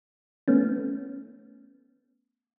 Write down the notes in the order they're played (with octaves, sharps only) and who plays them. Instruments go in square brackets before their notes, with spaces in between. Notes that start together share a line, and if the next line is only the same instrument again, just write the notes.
[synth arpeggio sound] A3 B3 C#4